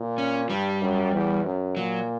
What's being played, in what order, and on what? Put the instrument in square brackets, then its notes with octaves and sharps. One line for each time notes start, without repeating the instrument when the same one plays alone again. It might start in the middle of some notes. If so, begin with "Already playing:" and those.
Already playing: [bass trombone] A#2
[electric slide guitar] C#4
[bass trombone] G2 [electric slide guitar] G3
[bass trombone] F#2
E2
F#2
[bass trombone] A#2 [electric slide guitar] F#3